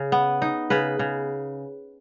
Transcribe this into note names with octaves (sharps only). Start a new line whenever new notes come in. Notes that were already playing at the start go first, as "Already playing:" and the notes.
Already playing: C#3
B3
D#4
C#3 B4
C#3